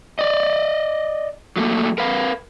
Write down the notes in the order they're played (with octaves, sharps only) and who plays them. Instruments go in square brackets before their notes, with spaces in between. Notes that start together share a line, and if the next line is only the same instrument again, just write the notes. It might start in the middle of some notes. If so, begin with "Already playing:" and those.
[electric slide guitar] D5 D#5
F#3 A3 A#3
A#4 B4 F5